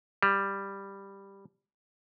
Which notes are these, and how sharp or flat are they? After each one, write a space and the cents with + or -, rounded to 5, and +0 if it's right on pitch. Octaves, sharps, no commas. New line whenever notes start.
G3 +5